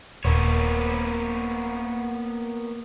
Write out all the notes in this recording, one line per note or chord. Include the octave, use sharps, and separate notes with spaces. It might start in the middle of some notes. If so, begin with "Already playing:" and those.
D#1 A#3 B3 C#5